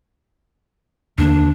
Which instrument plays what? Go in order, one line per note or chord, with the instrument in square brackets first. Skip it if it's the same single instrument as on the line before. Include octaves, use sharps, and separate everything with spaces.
[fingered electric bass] D#2 D3 A#3 [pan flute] D4